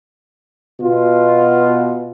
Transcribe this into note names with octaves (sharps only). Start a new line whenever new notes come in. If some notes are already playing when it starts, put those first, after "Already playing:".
B2 F4